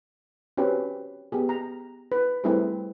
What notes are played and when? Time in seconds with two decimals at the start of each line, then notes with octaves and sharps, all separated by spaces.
0.57 C4 C#4 F#4 G4 B4
1.32 B3 G4 G#4
1.49 A#5
2.12 B4
2.44 G3 A3 C4 E4 G#4 B4